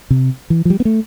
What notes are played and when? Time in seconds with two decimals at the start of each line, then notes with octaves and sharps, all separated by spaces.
0.10 C3
0.50 E3
0.65 F3
0.70 G3
0.80 B3
0.85 A3